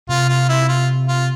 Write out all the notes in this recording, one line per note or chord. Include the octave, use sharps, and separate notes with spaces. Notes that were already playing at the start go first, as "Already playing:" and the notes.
C3 F4
F4
E4
F4
F4